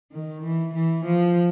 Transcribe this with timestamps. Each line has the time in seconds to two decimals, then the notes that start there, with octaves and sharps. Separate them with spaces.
0.12 D#3
0.43 E3
0.74 E3
1.05 F3